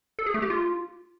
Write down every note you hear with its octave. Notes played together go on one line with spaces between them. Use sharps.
A4
G#4
A3
G4
F4